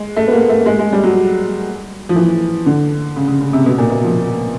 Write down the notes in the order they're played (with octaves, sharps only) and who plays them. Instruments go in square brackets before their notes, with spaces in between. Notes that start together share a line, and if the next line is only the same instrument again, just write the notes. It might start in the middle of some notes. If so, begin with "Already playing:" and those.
Already playing: [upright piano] G#3
A3
B3
A#3
A3
G#3
G#3
G3
F#3
F3
E3
D3
C#3
C#3
C#3
C3
B2
A#2
B2
F3